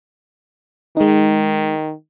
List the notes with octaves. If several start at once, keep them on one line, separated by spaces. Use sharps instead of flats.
D#3 G#3 D#4